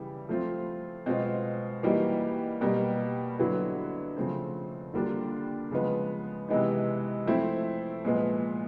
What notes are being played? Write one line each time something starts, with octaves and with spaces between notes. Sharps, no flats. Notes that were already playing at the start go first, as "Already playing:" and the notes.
Already playing: C#3 E3 G3 E4
F3 A3 C4 F4
B2 G#3 C4 F4
E3 G3 A#3 D#4 F#4
B2 G3 A#3
D3 F#3 B3 E4
C#3 F3 A3 C4
D3 G3 A#3 D4 F4
C#3 F3 G#3 B3
C3 E3 G#3 B3 D#4
F3 A3 C4 E4
A#2 F3 G#3 B3